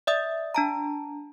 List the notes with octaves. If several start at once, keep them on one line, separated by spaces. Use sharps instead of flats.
D5 E5 D#6
D4 A5 A#5